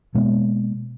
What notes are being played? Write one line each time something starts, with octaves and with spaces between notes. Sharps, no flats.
B2 G#3 A#3 B3